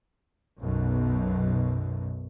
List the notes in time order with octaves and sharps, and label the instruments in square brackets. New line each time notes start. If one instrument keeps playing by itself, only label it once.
[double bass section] B1 F#2 B2